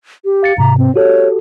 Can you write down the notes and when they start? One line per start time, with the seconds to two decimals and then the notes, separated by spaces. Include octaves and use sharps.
0.25 G4
0.43 F5 A6 C#7
0.58 G#2 C3 A#5
0.78 C4
0.96 F#4 G4 A4 C#5